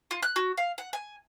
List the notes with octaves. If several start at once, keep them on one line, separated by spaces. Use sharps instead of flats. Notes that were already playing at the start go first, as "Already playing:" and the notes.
F4
F#6
F#4
F5
F#5
G#5